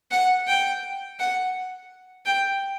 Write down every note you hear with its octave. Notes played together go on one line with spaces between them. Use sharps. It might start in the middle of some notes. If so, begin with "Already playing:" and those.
F#5
G5
F#5
G5